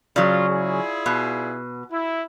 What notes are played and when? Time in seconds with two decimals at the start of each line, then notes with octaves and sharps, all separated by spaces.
0.16 C#3 F#3 F4 D5
0.47 E4 F4 G#4
1.06 B2
1.90 E4